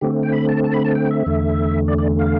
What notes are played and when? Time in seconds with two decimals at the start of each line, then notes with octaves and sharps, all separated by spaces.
0.01 D3 A3 C4 G4
0.23 G5
0.32 B5
0.49 A5
0.64 A5
0.74 B5
0.85 A5
0.95 G5
1.11 E5
1.26 E2 D3 A3
1.88 D5
1.98 D5
2.19 F5